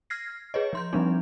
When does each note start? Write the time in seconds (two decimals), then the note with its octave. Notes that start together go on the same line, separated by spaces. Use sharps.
0.10 F6 G#6 A#6 C7
0.54 G#4 B4 C#5 D#5
0.73 F3 C6 G6
0.93 F3 G3 G#3 C4 D4 D#4